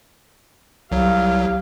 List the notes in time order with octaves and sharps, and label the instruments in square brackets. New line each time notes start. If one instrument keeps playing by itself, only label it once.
[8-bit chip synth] C2 F#3 [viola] G4 F5